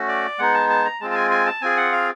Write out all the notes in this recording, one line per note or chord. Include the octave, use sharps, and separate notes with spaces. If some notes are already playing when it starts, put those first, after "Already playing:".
Already playing: A3 C#4 F#4
D5
G#3 B3 D#4 F#5
A5
A5
A#5
G#3 C4 F4 A5
A5
G#5
G#5
A5
C4 F4 G#4 G#5
F#5
F5